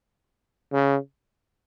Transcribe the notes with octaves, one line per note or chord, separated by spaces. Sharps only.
C#3